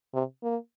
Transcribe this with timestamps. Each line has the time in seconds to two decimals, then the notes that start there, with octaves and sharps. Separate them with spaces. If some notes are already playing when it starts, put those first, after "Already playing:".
0.14 C3
0.43 A#3